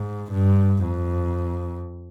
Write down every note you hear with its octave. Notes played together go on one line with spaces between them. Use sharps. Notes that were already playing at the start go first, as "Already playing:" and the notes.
Already playing: G#2
G2
F2